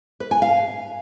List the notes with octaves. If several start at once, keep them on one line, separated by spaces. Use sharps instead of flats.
B4
G#5
F5